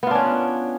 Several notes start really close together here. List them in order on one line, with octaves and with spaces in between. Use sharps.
B3 F4 D4 C#4